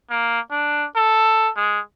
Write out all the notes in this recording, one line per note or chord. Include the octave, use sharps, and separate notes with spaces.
A#3
D4
A4
G#3